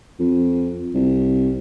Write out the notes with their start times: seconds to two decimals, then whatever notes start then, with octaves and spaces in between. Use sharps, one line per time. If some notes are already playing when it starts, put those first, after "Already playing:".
0.19 F2
0.94 C2